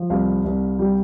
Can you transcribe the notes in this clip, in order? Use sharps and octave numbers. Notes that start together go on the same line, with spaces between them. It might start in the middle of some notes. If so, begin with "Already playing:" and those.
Already playing: F3
C2 F5
C2
G3